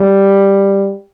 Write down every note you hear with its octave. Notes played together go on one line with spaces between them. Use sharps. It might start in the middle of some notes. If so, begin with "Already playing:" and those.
Already playing: G3